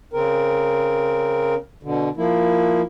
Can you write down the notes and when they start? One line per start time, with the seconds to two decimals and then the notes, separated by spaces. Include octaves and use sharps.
0.13 C#3 C4 A#4
1.83 B2 D3
2.17 F3 A#3 E4